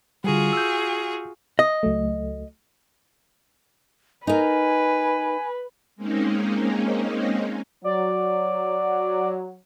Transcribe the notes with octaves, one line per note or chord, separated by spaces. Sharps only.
D3 G3 F4 F#4 G#4
E6 G6
D#5
C#2 F#3 A3
D#4 A#4 B4 G#5
G#3 A#3 C4 C#4 D#4
F#3 D5